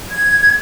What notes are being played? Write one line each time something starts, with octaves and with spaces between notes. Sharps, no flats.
G#6